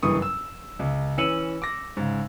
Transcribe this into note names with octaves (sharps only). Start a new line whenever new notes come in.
F#1 G2 E3 C#6 D#6
E6
C#2
E3 C#4 E6 C#7 D#7 F#7
D6 A#6
G#2 C#3